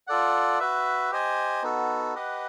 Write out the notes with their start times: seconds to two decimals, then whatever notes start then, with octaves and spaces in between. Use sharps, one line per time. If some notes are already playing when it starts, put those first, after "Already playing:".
0.07 F4 A4 D5 F#5
0.59 F#4 B4 E5
1.11 G4 C5 D#5 G#5
1.63 B3 D#4 F#4 A4
2.15 G4 B4 D#5 F#5